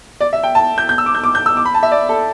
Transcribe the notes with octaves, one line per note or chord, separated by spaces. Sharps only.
D5
E5
G5
A5
G6
G6
E6
D6
G6
D6
G6
E6
D6
B5
A5
E5
D5
A4